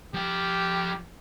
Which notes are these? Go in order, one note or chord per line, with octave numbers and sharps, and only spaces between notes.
F3 G4 G5